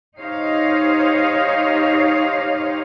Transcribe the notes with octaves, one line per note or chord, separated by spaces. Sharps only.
D#4 G4 C5 C#5 D#5 F5